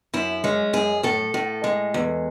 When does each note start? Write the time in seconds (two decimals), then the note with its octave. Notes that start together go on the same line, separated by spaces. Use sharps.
0.13 F#2 E4
0.44 G#3 C#4
0.73 F#2 G#4
1.03 A2 A4
1.34 A2
1.64 G#3
1.94 E2